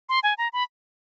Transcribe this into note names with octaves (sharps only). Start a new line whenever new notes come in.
C6
G#5
A#5
B5